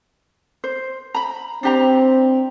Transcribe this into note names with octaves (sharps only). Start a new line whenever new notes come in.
C5
A#5 B5
C4 D4 G4 A#5